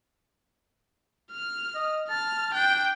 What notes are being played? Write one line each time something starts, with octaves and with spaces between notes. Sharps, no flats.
F6
D#5
A5 F6
D4 G5